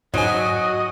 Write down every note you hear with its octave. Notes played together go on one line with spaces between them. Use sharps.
G#2 F#3 F#4 D#5 G#5